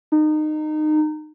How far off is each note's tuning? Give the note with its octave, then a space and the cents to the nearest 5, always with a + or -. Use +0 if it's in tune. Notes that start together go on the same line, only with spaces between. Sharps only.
D#4 -25